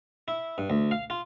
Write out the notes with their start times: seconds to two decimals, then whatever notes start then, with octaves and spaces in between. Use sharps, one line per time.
0.28 E4
0.58 G2
0.70 D2
0.91 F5
1.10 F4